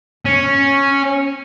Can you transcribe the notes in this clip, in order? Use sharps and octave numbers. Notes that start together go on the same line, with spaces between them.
C#4